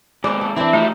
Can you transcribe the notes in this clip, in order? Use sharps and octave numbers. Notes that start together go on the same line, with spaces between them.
D#2 G#2 B3 C5 D5
A4
E3 C4 D4 E4 E5
F3 G3 A3 D#4 D#5